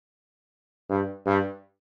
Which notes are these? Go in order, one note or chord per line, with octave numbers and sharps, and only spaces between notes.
G2
G2